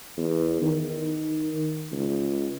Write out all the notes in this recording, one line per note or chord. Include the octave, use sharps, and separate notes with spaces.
E2
D#3
C#2